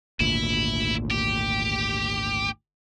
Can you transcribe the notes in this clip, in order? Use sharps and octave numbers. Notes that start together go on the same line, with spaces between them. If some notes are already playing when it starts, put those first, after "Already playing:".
G#1 D2 A#2 E4
G4